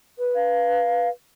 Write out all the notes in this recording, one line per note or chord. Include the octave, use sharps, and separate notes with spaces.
B4
F5